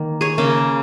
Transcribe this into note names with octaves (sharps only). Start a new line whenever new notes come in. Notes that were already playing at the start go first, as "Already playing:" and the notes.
Already playing: D#3 A#3
G#4 C#5
C#3 A#3